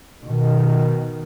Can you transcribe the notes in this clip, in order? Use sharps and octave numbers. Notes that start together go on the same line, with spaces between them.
B2 D#3